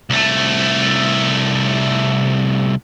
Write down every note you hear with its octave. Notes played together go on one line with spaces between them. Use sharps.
C2 A3